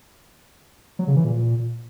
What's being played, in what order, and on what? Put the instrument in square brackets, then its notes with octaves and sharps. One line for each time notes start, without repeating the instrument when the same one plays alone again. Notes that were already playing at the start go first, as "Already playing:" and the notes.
[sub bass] F#3
C#3
E3
A#2